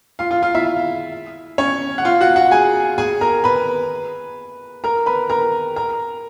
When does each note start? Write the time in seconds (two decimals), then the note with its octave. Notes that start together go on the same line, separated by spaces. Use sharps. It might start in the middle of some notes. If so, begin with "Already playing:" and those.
0.19 F4 F5
0.31 F4 F5
0.43 F4 F5
0.55 E4 E5
1.58 C#4 C#5
1.98 F#5
2.05 F4 F5
2.21 F#4 F#5
2.36 F#4 F#5
2.51 G#4 G#5
2.98 G#4 G#5
3.21 A#4 A#5
3.44 B4 B5
4.84 A#4 A#5
5.06 B4 B5
5.30 A#4 A#5
5.76 A#4 A#5